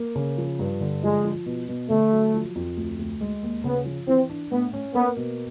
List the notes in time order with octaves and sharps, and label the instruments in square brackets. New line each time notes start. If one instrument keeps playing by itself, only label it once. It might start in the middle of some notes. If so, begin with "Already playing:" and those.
Already playing: [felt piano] A#3
C#3
F3
G2
D3
[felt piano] F3 [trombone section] G#3
[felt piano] F3
B2
B2
[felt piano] D3 [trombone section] A3
[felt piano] F#3
F3
F2
D2
D2
G#3
D#2
[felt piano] C#3 [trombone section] B3
[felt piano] F3
[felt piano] E3 [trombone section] C4
[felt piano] D4
[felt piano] A2 [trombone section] B3
[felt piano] C#4
[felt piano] A#3 [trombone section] B3
[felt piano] B2